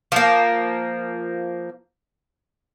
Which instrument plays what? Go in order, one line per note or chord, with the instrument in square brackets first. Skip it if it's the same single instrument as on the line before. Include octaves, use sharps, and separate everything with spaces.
[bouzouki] F3 A#3